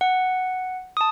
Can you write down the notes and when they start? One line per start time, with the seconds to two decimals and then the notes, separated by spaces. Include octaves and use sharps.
0.01 F#5
0.97 A5 D#6